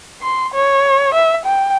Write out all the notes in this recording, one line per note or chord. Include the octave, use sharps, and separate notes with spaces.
C6
C#5
E5
G5